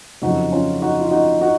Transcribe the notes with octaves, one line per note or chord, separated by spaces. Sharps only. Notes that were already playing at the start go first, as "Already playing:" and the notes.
F2 C#3 F#3 D#4 F#4
C#4 F4
D#4 F#4
F4
D#4 F#4
D#4 F#4